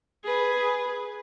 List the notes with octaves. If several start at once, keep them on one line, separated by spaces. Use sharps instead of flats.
G#4 B4